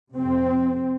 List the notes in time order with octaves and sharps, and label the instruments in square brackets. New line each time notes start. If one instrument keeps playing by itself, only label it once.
[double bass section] F2 C3 C4